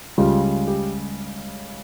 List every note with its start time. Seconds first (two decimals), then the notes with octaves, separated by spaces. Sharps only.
0.18 C#2 C#3 G3 F4
0.43 F4
0.67 G4